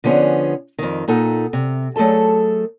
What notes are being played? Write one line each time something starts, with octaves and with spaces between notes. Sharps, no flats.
D3 F3 B3 C#4 G#4
F2 D#3
A#2 D#4 A4 F#5
C3
F#3 A3 G#4 A4 A5